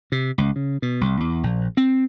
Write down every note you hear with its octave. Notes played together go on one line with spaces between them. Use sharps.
C3
C#2
C#3
B2
C2
E2
A#1
C4